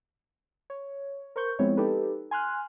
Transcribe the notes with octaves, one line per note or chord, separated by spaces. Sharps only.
C#5
A#4 C5 C#6 G6
F3 G#3 B3 C4 E4 C#5
D#4 G4 A4 B4
G#5 C6 F6 F#6